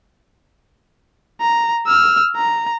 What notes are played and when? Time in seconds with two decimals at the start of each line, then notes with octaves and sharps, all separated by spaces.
1.41 A#5
1.88 E6 F6
2.36 A#5